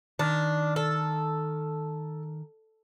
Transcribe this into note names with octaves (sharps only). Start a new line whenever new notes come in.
D#3 D4
A4